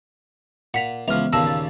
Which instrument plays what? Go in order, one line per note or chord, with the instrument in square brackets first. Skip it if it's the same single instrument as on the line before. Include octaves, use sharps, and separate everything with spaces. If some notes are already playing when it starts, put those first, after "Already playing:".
[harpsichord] A#2 [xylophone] F#5 B6 F7
[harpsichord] C#2 F3 [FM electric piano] E3 B3 B4 [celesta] E5 [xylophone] F6 F7
[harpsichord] D#2 A#2 C#3 [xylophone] A5 A#6 [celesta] E6
[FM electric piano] A6